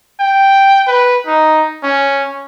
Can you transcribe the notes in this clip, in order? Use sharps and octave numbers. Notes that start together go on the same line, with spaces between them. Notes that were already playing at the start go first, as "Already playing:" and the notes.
G5
B4
D#4
C#4